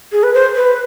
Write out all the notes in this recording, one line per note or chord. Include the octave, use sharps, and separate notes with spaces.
G#4
B4
C5
B4